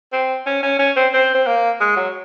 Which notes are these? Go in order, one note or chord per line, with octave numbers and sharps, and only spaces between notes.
C4
C#4
C#4
C#4
C4
C4
C4
A#3
G#3
F#3